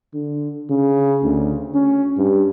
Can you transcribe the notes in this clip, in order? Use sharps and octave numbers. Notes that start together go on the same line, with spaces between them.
D3
C#3
D2
C#4
G2